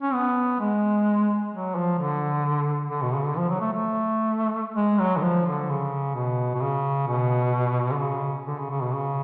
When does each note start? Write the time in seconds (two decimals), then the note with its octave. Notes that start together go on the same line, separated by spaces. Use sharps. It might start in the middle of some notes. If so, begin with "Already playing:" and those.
0.02 C#4
0.13 B3
0.60 G#3
1.52 F#3
1.75 F3
1.98 D3
2.91 D3
3.02 B2
3.14 C#3
3.25 D3
3.37 F3
3.50 F#3
3.60 A3
3.73 A3
4.76 G#3
4.99 F#3
5.17 D3
5.22 F3
5.46 D3
5.69 C#3
6.15 B2
6.54 B2
6.62 C#3
7.08 B2
7.92 D3
8.00 C#3
8.47 D3
8.58 C#3
8.70 C#3
8.82 B2
8.93 C#3